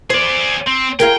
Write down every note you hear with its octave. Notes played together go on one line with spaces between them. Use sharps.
G#4 C5 D5
C4
F4 G#4 A#4 G5